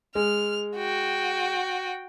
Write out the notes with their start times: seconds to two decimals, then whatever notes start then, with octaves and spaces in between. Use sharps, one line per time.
0.15 G#3 F6
0.77 F#4 G5